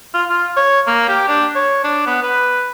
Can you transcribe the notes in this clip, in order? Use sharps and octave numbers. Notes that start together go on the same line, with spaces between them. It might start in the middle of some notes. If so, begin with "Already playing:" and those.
F4
F4
C#5
A#3
G4
D4
C#5
D4
B3
B4